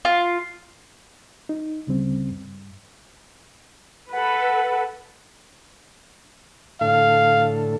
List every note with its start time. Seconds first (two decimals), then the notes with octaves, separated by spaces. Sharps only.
0.05 F4
1.49 D#4
1.87 D2 C#3 G3 C4
2.30 G2
4.12 A4 B4 F#5
6.81 A2 D3 A4 F5